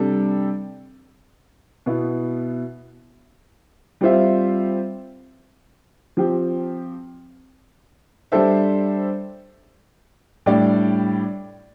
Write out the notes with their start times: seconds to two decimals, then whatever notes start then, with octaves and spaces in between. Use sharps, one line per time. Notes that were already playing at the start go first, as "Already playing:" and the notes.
Already playing: C3 G3 D4 A4
1.86 B2 B3 E4
4.01 G3 C4 F4 C5 E5
6.17 F3 C4 G4
8.32 G3 D4 A4 C5 E5
10.46 A2 G3 D4 G4 D5